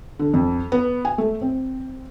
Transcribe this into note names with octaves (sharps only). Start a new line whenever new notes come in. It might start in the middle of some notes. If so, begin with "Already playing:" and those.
D3
F2
B3
G#5
A3
C4